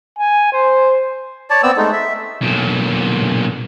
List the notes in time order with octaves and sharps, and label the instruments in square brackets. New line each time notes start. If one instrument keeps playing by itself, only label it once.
[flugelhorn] G#5
C5
[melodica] C#5 D5 A5
B3 C4 D5 E6
G#3 A3 D#4
E5
[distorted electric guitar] B1 A#2